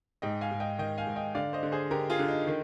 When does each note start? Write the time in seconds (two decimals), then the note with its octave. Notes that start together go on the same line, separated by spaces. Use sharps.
0.22 G#2 D#5 G5
0.41 F5 G#5
0.51 G#2
0.60 D#5 G5
0.79 D#3 D#5 G5
0.98 F5 G#5
1.07 G#2
1.16 D#5 G5
1.35 D3 D5 F5
1.53 C5 D#5
1.63 D3
1.72 G#4 C5
1.91 D3 G4 A#4
2.10 F4 G#4
2.19 D3
2.28 D#4
2.47 D#3